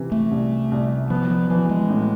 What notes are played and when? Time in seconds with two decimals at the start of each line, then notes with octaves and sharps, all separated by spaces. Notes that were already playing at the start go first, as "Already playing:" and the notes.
Already playing: C3 E3
0.12 A3
0.31 C2
0.71 C2
1.10 F3 B3
1.30 F3
1.50 E3 F3
1.70 G#3
1.90 A2